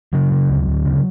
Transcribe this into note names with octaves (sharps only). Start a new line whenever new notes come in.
C#3 F#3
C#3
D2
D2
C#3